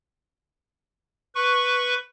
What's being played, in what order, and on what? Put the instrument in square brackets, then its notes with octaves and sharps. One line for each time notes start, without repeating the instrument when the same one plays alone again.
[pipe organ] B4 C#6